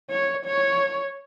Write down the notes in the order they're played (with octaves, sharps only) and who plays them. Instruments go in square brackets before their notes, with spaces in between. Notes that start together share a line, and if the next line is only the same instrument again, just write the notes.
[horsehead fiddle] C#5
C#5